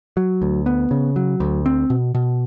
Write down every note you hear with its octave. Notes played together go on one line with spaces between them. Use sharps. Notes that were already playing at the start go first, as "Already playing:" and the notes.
F#3
D2
B3
C#3
F#3
D2
C4
B2
B2